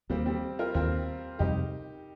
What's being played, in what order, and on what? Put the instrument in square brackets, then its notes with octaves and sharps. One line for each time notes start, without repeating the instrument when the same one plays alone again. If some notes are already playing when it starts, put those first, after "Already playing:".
[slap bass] D#2 D#3 A#3 [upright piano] G3 C4
[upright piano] G3 C4
F4 A#4
[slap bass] D#2 D#3 A#3 [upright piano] C4 F4
[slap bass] F2 C3 G3 C4 [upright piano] D#4 G4